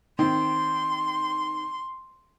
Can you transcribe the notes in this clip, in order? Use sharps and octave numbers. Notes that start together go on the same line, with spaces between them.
D#3 C4 C6